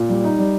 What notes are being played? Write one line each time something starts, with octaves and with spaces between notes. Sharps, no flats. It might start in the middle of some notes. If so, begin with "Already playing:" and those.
Already playing: A#2
G3
D#4
G3